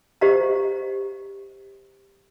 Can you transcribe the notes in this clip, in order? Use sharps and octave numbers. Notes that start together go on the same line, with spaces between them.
G4 C5 D#5 F5 A#5